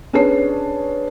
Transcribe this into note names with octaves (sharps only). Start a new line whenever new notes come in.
C#4 D4 G#4 B4 C#5 C7